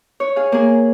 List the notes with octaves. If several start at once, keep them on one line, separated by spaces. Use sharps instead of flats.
C#5
G#4 F5
A#3 G#4